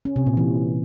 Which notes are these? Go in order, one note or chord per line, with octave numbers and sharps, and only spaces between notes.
C#4
C3
A#2
E3